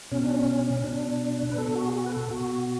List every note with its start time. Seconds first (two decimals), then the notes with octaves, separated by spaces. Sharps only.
0.11 B2 C#4
0.23 D4
0.34 C#4
0.77 C#4
0.84 B2 D4
1.52 B4
1.58 B2 A4
1.76 F#4
1.88 G#4
1.93 F#4
2.06 B4
2.12 A4
2.30 B2 F#4